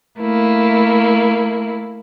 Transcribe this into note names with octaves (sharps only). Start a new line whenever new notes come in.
A3 A#3 E4